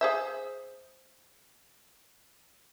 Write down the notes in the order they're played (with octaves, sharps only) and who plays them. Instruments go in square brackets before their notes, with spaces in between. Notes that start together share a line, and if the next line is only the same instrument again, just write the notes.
[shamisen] G#4 C5 E5